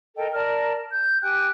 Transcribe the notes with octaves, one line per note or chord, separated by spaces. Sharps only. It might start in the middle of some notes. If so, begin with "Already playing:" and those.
A4 A#4 D#5 G5
A#4 D5 A5 F6
G6
G4 G5 G#5 F#6